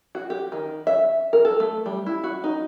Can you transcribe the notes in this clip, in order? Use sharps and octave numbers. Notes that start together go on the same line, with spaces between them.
F#4
G4
D#3
E5
A#4
A4
A3
G3
E4
F#4
D#4